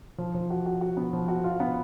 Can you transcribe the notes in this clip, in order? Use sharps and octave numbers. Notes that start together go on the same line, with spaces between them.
F3
F3
F#4
F#4
F#4
B3
F3
F#4
F4
B3